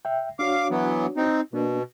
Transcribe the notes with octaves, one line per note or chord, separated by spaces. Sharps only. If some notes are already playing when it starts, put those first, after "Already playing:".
E5 G5
D4 F#4 C#5 F5 D6
E3 F#3 B3
C4 D#4
B2 A#3 D4